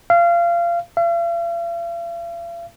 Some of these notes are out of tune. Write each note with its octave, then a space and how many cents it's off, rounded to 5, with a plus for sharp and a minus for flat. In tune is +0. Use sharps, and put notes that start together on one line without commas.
F5 -25
F5 -45